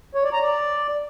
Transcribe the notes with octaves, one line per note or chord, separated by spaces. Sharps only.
C#5
D5
A#5
D5